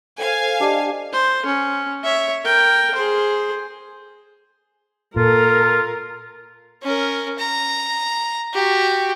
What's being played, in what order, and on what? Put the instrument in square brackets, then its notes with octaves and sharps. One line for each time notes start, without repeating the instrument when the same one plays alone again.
[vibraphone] A4 C5 [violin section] F5 G#5
[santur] D4 G4 D5 [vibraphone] D#5
[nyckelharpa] C5
C#4
C#5 E5
A#4 G5
G#4 C5
[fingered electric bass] A#2 [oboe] F4 [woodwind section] A4 [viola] A#4
[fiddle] C#4 A#4
A#5
F#4 G4